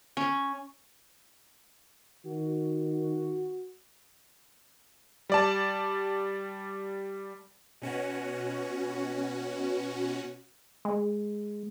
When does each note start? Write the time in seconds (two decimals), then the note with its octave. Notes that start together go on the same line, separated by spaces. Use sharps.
0.17 C#4
2.26 D#3 F#4
5.30 G3 D5 A5
7.82 B2 C#4 F#4
10.85 G#3